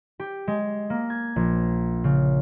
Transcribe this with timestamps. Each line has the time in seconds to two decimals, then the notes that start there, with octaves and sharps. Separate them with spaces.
0.20 G4
0.47 G#3
0.90 A#3
1.10 G#6
1.36 A#1
2.04 C#3